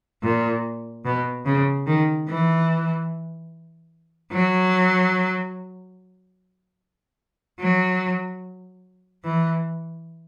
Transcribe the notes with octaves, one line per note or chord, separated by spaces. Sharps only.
A#2
B2
C#3
D#3
E3
F#3
F#3
E3